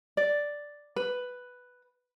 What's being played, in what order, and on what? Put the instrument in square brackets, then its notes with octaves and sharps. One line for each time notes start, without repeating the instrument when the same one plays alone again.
[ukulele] D5
B4